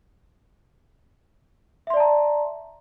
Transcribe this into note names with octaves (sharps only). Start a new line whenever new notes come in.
D5 E5 A5 A#5 C6